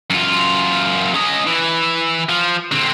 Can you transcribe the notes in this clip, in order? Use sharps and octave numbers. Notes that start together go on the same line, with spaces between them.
F#2 F4
C#4 D#5
E3
F3
D3 C4